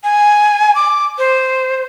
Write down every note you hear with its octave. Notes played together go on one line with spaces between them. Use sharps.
G#5
D6
C5